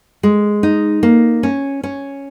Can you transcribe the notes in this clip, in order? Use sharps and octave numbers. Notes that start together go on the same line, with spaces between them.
G#3
D#4
A#3
C#4
C#4